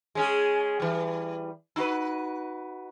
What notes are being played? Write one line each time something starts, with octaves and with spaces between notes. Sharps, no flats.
G#3 C#4 G#4
E3 G3
D#4 F#4 B4